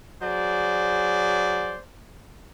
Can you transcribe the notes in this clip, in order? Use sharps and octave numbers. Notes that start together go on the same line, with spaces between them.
F#3 G#4 C5 D5